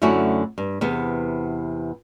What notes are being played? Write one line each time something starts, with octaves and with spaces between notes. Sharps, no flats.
F#2 D3 A3 C#4 E4 F#4
G2
E2 C3 B3